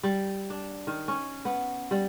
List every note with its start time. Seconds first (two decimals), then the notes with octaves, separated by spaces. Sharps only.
0.03 G3
0.50 D4
0.87 D#3
1.08 C#4
1.45 B3
1.91 G3